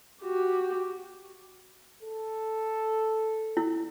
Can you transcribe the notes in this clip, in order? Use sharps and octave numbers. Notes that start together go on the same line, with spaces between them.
F#4 G4
A4
E4